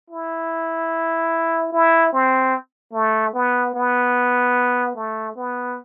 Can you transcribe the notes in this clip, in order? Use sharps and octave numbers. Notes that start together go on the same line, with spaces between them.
E4
E4
C4
A3
B3
B3
A3
B3